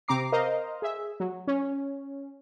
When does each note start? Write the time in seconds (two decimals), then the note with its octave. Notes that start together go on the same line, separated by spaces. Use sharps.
0.08 C3 C4 A#5 D6 C7
0.32 A#4 C5 D#5 F5 A#5
0.82 G#4 E5
1.20 F#3
1.47 C#4